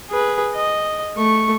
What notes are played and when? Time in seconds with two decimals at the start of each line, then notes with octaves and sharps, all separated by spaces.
0.10 G#4 B4
0.55 D#5
1.17 A3 C#6